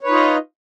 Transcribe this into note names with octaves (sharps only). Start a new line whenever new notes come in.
D#4 F4 B4 C#5 D#5